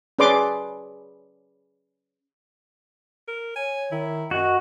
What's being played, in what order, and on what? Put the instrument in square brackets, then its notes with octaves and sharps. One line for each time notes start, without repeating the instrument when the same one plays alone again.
[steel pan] C#4 G#4 B4 D5 C6 D6
[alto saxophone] A#4
[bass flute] C#5 [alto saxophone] G#5
[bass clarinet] D#3 [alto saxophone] E4
[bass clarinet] F#2 [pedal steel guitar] F#4 [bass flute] D#5